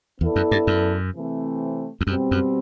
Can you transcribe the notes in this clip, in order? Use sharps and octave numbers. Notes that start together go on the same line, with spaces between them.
E2 B3 E4 A4 D5
F#2
G2
F#2
C3 E3 A3 C4
E2
F#2 B2 G3 C4
F#2